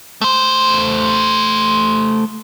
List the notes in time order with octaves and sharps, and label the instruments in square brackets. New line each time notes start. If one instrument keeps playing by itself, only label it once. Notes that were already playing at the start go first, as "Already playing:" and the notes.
[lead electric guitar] A3 C5